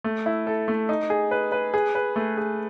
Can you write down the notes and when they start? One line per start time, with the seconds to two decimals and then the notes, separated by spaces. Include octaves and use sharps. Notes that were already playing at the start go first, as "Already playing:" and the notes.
0.04 A3
0.26 E4
0.47 A4
0.68 A3
0.89 D#4
1.10 G#4
1.31 B4
1.52 B4
1.74 G#4
1.95 B4
2.16 A3
2.37 G#4